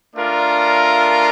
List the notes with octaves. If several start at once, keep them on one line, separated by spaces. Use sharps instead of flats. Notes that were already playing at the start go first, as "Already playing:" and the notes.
A3 D4 F4 A#4